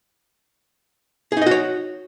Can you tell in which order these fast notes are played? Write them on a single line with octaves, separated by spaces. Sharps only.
G#4 D#4 D#5 F#4 C#5